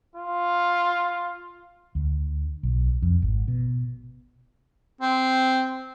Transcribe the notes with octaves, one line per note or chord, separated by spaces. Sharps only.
F4
D2
B1
F2
G#1
B2
C4